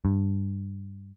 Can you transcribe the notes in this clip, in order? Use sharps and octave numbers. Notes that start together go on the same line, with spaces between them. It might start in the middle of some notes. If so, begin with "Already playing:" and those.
G2